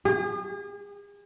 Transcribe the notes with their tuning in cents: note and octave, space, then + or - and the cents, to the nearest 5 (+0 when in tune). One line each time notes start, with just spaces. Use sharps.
G#4 -40